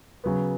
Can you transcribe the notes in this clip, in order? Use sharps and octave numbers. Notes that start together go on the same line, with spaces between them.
C#3 F#3 B3